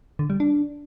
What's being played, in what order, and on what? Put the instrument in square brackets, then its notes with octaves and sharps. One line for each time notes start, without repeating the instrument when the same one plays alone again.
[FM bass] D3
G3
D4